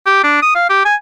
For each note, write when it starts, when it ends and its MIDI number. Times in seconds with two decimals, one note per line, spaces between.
0.06 0.24 67
0.24 0.41 62
0.42 0.55 87
0.55 0.69 77
0.70 0.82 67
0.85 0.95 80